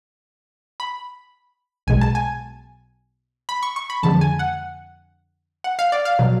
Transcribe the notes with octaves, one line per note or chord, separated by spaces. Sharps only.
B5
B1 B2 G#3 G#5
A5
G#5
B5
C#6
C#6
B5
F2 D3 G#3 A5
G#5
F#5
F#5
F5
D5
F5
B2 F#3